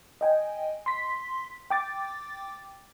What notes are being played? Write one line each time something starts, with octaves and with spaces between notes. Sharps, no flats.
D#5 G5 G#5
C6 B6
G5 D6 A6